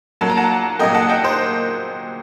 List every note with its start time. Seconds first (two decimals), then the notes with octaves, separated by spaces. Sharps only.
0.21 A#2 F#3 A#3 A5
0.30 A#5
0.37 F#5 A5
0.79 A#2 F#3 A#3 D#5 G5
0.94 F#5 A5
1.09 D#5 G5
1.24 C5 D#5